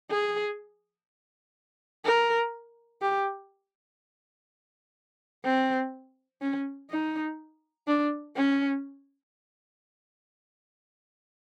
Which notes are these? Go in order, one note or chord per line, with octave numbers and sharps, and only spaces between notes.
G#4
A#4
G4
C4
C#4
D#4
D4
C#4